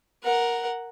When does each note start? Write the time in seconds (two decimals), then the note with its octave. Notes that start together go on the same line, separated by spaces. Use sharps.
0.23 A#4 F#5